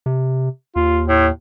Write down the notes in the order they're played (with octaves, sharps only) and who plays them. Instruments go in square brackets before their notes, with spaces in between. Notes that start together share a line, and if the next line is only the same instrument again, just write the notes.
[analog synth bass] C3
[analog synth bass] D#2 [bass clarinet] F4
[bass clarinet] A2